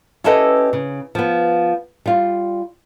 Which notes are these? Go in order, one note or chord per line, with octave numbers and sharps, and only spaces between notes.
C#4 E4 G4 A4 B4 D#5
C#3
F3 B3
G3 F4